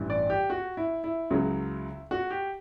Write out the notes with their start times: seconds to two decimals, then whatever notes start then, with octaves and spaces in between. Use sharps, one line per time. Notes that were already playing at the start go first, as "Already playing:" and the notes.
Already playing: A1 G2 E3
0.10 D5
0.30 G4
0.50 F#4
0.77 E4
1.04 E4
1.30 C#2 C#3 F#3
2.11 F#4
2.31 G4